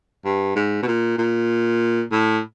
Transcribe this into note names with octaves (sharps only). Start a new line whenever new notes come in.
G2
G#2
B2
A#2
A#2
A2